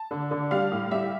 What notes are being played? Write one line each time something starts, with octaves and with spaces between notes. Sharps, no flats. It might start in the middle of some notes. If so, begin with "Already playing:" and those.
Already playing: A5
D3
D3
G3 F5
A2
G3 E5